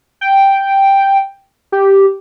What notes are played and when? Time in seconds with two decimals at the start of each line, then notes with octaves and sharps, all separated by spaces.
0.21 G5
1.72 G4